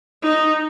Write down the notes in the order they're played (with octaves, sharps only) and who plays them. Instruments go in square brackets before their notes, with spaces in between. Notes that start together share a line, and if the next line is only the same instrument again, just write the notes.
[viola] D#4